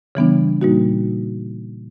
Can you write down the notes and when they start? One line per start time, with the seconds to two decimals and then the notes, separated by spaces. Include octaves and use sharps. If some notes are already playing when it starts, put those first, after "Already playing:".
0.15 C#3 E3 G3 B3 D4
0.61 A#2 G3 A#3 D#4 F#4